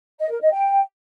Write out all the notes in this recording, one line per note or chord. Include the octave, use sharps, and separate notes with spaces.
D#5
A#4
D#5
G5